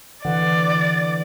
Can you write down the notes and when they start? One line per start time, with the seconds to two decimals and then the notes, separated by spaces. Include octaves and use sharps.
0.25 D3 E3 D5 F#5